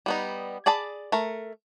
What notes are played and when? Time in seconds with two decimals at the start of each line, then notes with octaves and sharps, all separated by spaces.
0.06 G3 B3 D#4
0.66 G#4 D5 A5 B5
1.12 A3 A#4